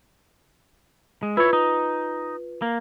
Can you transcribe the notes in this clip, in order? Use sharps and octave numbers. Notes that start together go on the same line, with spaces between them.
G#3
E4 F4 B4 C#5
D#4
A#3